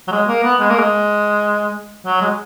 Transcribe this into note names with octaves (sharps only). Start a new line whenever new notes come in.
F#3
G#3
A#3
B3
G#3
A#3
G#3
F#3
G#3